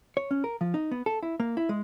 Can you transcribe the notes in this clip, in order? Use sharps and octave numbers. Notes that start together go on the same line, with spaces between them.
C#5
C#4
A#4
F3
D#4
B3
A4
E4
A#3
E4
G#3